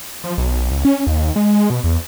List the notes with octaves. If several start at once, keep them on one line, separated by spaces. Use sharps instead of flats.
F3
B1
C#2
C#4
D#2
G#3
B2
E2